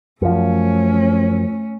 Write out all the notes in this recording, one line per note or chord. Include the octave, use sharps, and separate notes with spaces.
F#2 F3 A3 C#4